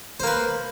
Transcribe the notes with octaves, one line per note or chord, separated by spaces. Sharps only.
A#3 B4 C5